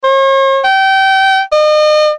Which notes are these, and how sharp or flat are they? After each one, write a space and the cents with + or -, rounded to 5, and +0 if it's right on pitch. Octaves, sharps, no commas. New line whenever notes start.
C#5 -45
G5 -25
D#5 -40